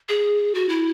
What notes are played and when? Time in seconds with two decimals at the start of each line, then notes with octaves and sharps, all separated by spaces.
0.09 G#4
0.54 F#4
0.69 E4